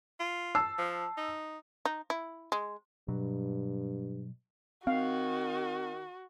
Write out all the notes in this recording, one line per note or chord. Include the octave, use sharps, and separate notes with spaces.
F4
A5 E6 C7
F3
D#4
D#4
E4
G#3
G2 B2 F#3
D#3 C4 F#4 F5